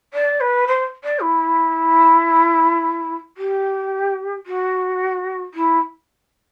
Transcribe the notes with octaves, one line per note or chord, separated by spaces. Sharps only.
D5
B4
C5
D5
E4
G4
F#4
E4